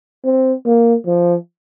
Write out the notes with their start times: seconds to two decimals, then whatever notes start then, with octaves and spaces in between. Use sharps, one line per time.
0.25 C4
0.66 A#3
1.06 F3